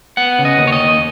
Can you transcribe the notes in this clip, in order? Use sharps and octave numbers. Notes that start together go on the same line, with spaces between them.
B3 F#5
C#3
D#5
D#2
C#5
D#5
D#2